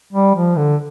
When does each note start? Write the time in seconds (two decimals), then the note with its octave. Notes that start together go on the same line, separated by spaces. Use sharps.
0.13 G3
0.35 F3
0.57 D3